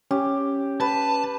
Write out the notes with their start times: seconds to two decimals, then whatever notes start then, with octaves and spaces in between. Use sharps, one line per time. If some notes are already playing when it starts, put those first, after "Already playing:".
0.11 C#4 G4
0.80 B4 A5